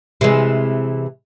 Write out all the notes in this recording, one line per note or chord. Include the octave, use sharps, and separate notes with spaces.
C3 E3 G#3